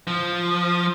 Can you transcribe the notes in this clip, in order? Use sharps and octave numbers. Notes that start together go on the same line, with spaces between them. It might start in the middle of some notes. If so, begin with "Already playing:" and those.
F3